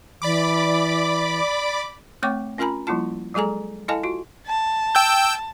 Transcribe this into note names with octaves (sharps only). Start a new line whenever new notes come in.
E3 D5 B5 D6
A3 C4 C#5 G5 C#6 D6
C#4 F4 A#4 G#5 A#5 B5
F3 G3 A#3 E4 F4 A5
F#3 G#3 G#4 A4 G#5 A#5
E4 A4 D#5 F5 G#5 A5
F4 F#4
A5
G5 E6 G6